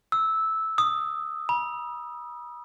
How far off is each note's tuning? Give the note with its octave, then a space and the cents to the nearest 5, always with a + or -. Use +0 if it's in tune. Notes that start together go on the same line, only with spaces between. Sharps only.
E6 -10
D#6 -10
B5 -40